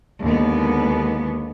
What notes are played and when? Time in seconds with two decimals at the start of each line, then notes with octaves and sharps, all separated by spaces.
0.23 D#2 D3 G#3 B3